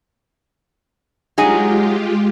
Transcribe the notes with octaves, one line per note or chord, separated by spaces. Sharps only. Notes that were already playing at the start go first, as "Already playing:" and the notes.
F#3 G#3 D#4 F4 G4 G#4